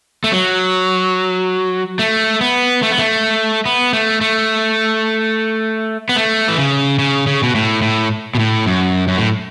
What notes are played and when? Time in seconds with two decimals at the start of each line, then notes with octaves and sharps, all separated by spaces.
0.24 A3
0.32 F#3
1.99 A3
2.41 B3
2.83 A3
2.91 B3
2.99 A3
3.66 B3
3.93 A3
4.21 A3
6.09 B3
6.16 A3
6.48 E3
6.58 C#3
6.99 C#3
7.27 C#3
7.43 B2
7.55 A2
7.82 A2
8.35 B2
8.39 A2
8.66 F#2
9.08 F#2
9.18 A2